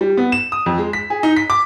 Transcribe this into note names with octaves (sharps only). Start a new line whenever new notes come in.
G3
B3
E7
D#6
F2
G#3
B6
G#4
D#4
B6
D6